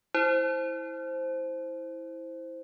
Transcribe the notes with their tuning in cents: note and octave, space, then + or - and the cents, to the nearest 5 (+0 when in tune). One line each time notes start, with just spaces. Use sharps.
E4 -10 C5 +0